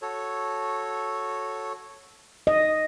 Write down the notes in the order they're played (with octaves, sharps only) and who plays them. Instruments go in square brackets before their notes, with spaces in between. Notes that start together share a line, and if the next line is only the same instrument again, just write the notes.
[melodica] F#4 A4 C#5
[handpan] D#5